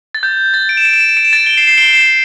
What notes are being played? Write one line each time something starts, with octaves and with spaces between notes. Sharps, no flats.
A6
G6
A6
D7
E7
D7
E7
D7
E7
D7
E7
A6 D7
D7 G7
C7 E7
C7 E7
D7 G7
C7 E7